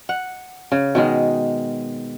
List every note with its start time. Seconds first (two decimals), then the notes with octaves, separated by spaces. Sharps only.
0.09 F#5
0.72 C#3
0.95 B2 D#3 G#3